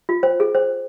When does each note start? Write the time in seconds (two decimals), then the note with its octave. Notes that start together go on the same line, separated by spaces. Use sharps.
0.09 F4
0.23 C5
0.40 G#4
0.55 C5